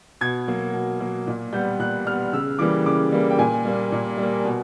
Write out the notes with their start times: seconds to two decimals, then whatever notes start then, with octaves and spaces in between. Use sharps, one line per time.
0.21 B2 G#6
0.48 F#3 A#3
0.74 B2
1.00 F#3 A#3
1.27 A#2
1.53 G3 B3 G6
1.79 A#2 F#6
2.06 G3 F6
2.10 B3
2.33 C#3 E6
2.59 E3 G3 A#3 D6
2.86 C#3 D6
3.12 E3 G3 A#3
3.30 G5
3.38 A#2 G#5
3.65 G3 A#3
3.92 A#2
4.18 G3
4.23 A#3
4.44 B2